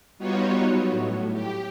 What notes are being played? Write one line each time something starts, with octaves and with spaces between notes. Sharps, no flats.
G3 B3 D#4 F4 F#4 C#5
F#3 B3
A2
G4